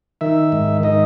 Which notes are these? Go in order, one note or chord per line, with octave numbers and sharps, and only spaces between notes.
D#3 E5
G#2
D#3 D#5